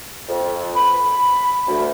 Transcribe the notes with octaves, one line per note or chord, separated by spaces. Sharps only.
F2
B5
D2